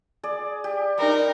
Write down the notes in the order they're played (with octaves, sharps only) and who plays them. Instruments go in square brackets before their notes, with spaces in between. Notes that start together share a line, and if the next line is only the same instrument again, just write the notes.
[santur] G#4 D5
G4
[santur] G3 [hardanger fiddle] D#4 A#4